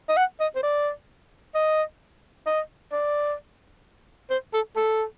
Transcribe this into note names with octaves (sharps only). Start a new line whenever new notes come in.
D#5
F#5
D#5
C5
D5
D#5
D#5
D5
C5
A4
A4